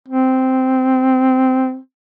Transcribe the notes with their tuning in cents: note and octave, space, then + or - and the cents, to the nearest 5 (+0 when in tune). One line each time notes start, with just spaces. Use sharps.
C4 -10